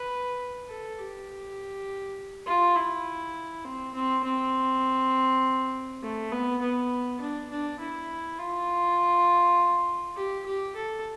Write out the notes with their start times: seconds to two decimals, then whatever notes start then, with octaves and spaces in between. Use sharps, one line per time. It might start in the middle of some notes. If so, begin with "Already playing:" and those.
Already playing: B4
0.69 A4
0.98 G4
2.47 F4
2.76 E4
3.65 C4
3.95 C4
4.24 C4
6.02 A3
6.32 B3
6.61 B3
7.20 D4
7.50 D4
7.80 E4
8.39 F4
10.16 G4
10.46 G4
10.76 A4